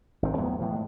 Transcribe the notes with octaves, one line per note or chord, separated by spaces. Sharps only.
G#1 G#2 C4
E2 A2 F#3 B3
A2 E3 F3
A2 G#3